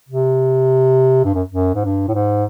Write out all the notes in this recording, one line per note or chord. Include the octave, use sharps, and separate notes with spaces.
C3
G2
F#2
F#2
G#2
G2
A2
G#2